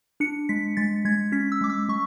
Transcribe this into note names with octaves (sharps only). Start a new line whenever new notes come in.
D4 C#7
G#3 B6
G#3 A6
G#3 G#6
C#4 B6
E6
G#3 D6
E6
G#3 C#6